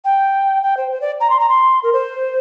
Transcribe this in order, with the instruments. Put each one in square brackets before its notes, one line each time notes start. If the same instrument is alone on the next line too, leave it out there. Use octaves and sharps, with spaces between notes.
[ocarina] G5
G5
C5
C5
D5
A#5
C6
A#5
C6
A#4
C5